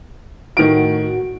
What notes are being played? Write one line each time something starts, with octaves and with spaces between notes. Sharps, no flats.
A2 D#3 F#4 D7